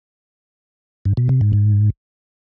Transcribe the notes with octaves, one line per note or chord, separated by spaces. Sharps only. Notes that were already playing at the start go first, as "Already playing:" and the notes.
G2
B2
C3
G#2
G#2